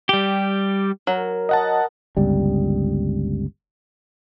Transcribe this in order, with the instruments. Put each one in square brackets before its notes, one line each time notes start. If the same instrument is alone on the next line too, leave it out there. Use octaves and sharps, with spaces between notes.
[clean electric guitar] G3 G4
[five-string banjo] F#3 [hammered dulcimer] A#4
[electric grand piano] D#5 F#5 A5
[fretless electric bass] G1 C#2 G3